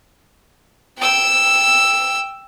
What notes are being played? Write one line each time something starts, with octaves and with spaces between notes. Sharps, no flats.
G5 E6